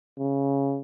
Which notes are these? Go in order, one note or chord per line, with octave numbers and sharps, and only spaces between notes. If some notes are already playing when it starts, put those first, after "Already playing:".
C#3